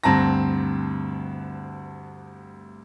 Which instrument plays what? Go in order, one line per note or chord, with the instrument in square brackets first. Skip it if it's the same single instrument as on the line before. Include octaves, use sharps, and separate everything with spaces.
[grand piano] D2 G2 C4 A5 A#5 A#6